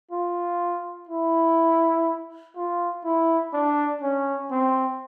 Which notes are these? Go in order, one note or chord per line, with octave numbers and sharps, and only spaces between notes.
F4
E4
F4
E4
D4
C#4
C4